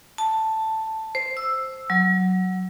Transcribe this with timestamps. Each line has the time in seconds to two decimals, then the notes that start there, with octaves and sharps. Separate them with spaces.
0.18 A5
1.15 C5
1.37 E6
1.90 F#3